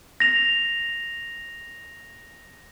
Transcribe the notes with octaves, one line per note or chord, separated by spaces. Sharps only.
A#6 F7